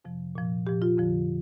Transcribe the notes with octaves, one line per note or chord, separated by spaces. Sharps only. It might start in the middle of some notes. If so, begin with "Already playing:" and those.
F2 C3 F3
A#2 F3
A#2 F3 G4
F4
F2 D3 F3